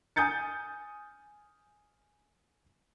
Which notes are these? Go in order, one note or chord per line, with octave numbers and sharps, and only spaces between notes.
G#5 D#6 G6 A6 C#7